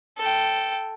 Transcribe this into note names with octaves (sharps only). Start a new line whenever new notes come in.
A4 G5